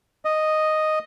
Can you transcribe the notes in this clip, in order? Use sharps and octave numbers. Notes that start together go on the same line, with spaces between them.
D#5